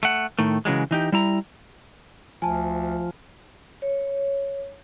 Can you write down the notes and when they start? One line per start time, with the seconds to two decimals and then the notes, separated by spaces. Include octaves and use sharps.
0.03 A3 F#5
0.39 A2 D#3 A3
0.65 C#3 E3 F#3 G#3
0.91 E3 D#4 G4
1.12 G3 E4 A#5
2.42 D2 F3 G#5 A5
3.82 C#5